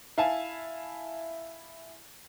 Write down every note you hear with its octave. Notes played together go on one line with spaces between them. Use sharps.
E4 F5 G#5 A5